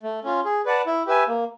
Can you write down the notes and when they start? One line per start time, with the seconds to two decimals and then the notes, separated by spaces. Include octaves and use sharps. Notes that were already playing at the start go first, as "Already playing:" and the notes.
0.03 A3
0.24 C#4 F4
0.45 G#4
0.65 B4 D5 F#5 A5
0.86 E4
1.07 G4 B4 E5 G#5
1.28 A#3